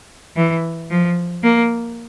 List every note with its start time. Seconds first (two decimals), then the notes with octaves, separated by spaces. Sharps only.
0.36 E3
0.90 F3
1.43 A#3